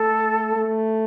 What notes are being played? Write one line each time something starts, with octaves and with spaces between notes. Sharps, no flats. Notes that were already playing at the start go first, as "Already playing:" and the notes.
Already playing: A3 A4
A3